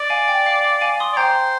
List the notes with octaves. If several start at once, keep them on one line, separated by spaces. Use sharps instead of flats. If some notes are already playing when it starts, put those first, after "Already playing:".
Already playing: D5
F5 G#5
G5
F5
F5
F5 G#5
C6 D#6
D5
C5 G5 A#5